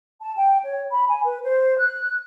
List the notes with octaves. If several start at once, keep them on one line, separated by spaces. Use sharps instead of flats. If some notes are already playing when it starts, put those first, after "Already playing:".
A5
G5
C#5
B5
G#5
B4
C5
F#6